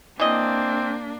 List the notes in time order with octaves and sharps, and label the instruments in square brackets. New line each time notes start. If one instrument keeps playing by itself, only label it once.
[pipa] E3 D#5 [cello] A#3 D4 [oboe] C4